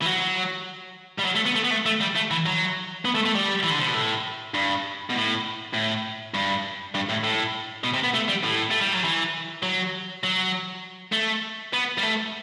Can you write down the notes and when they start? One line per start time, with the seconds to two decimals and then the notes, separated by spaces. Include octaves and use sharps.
0.02 E3
0.06 F#3
1.19 G3
1.25 F#3
1.36 A3
1.46 B3
1.55 A3
1.64 B3
1.70 A3
1.86 A3
2.01 G3
2.16 A3
2.31 E3
2.46 F#3
3.05 B3
3.15 A3
3.26 A3
3.35 G3
3.63 E3
3.70 D3
3.79 C3
3.87 B2
3.94 A2
4.54 G2
5.10 B2
5.15 A2
5.74 A2
6.34 G2
6.95 G2
7.09 A2
7.24 A2
7.84 B2
7.94 C3
8.04 B3
8.14 A3
8.29 G3
8.44 A2
8.71 A3
8.81 G3
8.93 F#3
9.04 E3
9.63 F#3
10.24 F#3
11.13 A3
11.73 B3
11.98 G3
12.03 A3